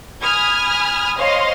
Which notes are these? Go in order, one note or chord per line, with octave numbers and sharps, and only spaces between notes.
G#5 B5 D#6 F6 G#6
C5 C#5 D#5 F5 C6